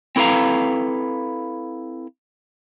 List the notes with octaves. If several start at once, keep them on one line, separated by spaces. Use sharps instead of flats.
C4 E4 A4 B4 F5 A#5